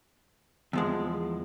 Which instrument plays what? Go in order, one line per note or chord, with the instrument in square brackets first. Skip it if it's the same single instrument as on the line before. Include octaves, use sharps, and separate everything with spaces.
[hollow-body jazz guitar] E2 F3 G#3